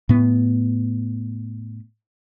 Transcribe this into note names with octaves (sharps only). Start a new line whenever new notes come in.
A2 B3